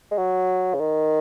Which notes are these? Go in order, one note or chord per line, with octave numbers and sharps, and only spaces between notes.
G#3
F#3
C#3
D#3